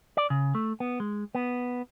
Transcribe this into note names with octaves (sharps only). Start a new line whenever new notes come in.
D5
C#3
A3
B3
G#3
B3